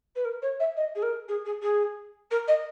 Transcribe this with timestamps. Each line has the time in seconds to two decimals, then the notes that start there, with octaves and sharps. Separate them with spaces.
0.15 B4
0.24 A#4
0.42 C#5
0.59 E5
0.76 D#5
0.95 G#4
1.02 A#4
1.28 G#4
1.45 G#4
1.62 G#4
2.30 A#4
2.47 D#5